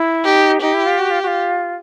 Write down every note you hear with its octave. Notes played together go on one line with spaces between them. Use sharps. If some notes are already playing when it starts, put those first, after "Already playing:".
Already playing: E4
D#4 G4
D#4 G4
E4
F4
F#4
F4
F#4
F4